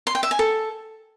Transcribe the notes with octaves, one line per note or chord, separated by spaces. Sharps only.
C6
G5
E5
G#5
A4